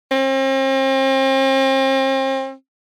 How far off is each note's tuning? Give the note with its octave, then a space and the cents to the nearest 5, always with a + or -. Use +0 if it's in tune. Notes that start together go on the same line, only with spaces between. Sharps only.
C4 +40